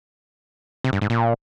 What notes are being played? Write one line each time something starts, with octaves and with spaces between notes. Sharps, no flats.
C3
G2
G#2
A#2